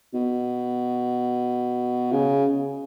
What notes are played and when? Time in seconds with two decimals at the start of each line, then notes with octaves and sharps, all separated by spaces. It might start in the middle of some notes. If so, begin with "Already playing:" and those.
0.14 B2
2.12 C#3